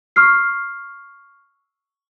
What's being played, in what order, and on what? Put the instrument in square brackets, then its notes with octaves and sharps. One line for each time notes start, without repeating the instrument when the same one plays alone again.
[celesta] C#6 E6 F6 C7